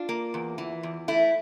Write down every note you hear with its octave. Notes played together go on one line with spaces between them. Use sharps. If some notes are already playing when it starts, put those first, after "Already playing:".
Already playing: D4 F4
A#3
E2
E3
E2
A3 E4